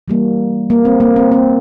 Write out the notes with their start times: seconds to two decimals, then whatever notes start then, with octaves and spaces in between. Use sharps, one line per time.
0.08 E3 G3 A#3
0.70 A#3
0.85 C4
1.00 A#3
1.16 C4
1.32 C4